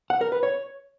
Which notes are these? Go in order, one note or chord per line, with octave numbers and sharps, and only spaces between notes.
F#5
A#4
B4
C#5